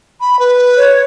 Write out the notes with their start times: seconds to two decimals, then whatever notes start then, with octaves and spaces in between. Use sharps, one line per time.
0.21 B5
0.39 B4
0.77 C#5